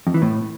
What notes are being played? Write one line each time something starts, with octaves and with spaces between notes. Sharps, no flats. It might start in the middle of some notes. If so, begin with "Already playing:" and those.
F2
E3
A2